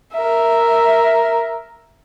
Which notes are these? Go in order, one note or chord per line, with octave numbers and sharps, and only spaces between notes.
A#4 E5